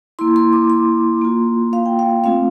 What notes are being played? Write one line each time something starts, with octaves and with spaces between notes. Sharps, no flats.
A#3 E4 C6
C6
D6
C6
A#3 F4
F5
G5
F5
A3 C4 F4 F5